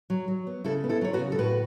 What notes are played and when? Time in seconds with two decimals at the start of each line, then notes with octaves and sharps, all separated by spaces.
0.10 F#3
0.28 F#3
0.47 B3
0.64 C#3 E4 A4
0.84 B3
0.89 E4 A4
1.01 F#3 C#5
1.13 F#4 B4
1.19 C#3
1.32 A4
1.38 A2 F#4 B4